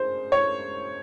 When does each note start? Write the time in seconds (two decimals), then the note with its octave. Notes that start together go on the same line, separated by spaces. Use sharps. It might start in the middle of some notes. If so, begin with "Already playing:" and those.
Already playing: C#3 C5
0.32 C#5